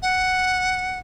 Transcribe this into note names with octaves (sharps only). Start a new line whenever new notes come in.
F#5